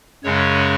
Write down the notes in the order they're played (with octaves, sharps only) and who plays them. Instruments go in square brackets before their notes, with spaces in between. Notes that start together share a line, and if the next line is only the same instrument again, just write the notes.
[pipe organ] F#2 C#3 G#3 C#4 C#5